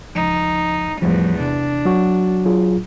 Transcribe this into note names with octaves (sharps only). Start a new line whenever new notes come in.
C#2 F3 D#4
E2 A2 F3 G3
C3 D4
F#3 F#4
F#3 F4 G#4